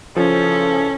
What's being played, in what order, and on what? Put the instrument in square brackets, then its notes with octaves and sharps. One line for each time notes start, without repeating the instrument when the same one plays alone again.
[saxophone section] C#3 E3 A4 [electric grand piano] F3 [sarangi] C#4